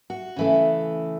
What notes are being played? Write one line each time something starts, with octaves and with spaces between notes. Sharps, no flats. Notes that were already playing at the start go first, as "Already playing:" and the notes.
F#4
C#3 E3 A3